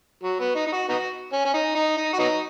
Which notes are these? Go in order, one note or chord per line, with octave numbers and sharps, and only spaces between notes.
F#3
B3
D#4
D#4
F#4
B3 D#4 F#4
C#4
C#4
D#4
D#4
D#4
F#4
F#3 B3 D#4